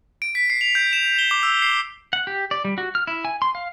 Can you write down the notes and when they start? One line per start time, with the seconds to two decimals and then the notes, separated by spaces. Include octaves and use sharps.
0.22 D7
0.35 B6
0.50 C7
0.61 F7
0.75 G6
0.93 E7
1.19 G7
1.31 D6
1.43 E6
1.62 C7
2.13 F#5
2.27 G4
2.51 D5
2.65 G3
2.78 F#4
2.95 F6
3.07 E4
3.25 G#5
3.42 C6
3.55 F5